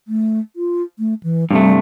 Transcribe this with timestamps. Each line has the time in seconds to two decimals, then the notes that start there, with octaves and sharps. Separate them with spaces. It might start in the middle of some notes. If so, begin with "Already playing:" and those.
0.08 A3
0.56 F4
0.99 A3
1.23 E3
1.51 G2 C3 G3 A3